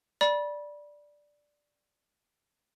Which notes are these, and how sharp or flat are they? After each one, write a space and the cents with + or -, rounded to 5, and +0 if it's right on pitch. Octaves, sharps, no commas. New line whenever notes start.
D5 +0 B5 -30